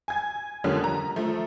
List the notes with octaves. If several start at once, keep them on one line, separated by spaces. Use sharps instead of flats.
G#5 G#6
F2 D3 G3 A#3 C#4
A#5
F3 A3